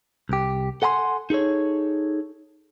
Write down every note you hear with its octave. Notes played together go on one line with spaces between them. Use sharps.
C2 G4
A4 F#5 G#5 A#5 C6
D#4 G#4 A4 C#5